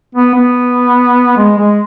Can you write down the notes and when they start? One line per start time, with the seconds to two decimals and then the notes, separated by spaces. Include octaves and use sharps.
0.15 B3
0.34 B3
1.37 G#3
1.58 G#3